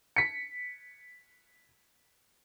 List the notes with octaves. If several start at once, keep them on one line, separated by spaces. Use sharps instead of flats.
B6 C#7